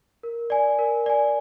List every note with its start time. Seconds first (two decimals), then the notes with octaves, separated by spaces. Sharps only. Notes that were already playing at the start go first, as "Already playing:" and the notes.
0.23 A#4
0.50 D5 G#5
0.79 A#4
1.06 D5 G#5